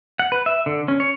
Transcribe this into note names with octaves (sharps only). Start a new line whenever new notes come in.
F#5
B4
E5
D3
C#4
C#5